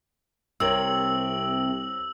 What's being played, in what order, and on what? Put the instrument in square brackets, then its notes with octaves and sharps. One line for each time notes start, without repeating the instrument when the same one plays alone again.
[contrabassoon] C2 [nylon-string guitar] C3 [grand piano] C4 A#4 C#5 [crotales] E6 F#7